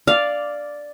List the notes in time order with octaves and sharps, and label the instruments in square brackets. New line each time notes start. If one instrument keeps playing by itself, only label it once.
[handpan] D5 [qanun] F5